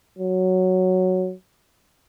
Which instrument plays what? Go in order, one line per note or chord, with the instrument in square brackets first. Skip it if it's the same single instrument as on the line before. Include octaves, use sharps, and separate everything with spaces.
[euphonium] F#3